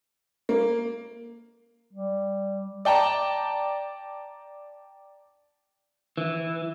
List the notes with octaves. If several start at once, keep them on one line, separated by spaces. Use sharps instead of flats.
A#3
G3
D5 G5 A5 A#5
E3